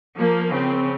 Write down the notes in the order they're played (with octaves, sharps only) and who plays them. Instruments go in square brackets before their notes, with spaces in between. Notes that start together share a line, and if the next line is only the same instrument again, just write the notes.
[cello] F3 [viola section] A#3
[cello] C#3 [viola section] C4